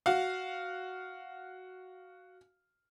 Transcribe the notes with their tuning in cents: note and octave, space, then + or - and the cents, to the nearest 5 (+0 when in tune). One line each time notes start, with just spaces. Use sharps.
F#4 +0 F5 +0